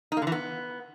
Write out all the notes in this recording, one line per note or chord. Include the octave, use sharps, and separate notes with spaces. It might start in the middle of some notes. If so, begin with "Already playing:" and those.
D#4
A#3
D3
E3
B3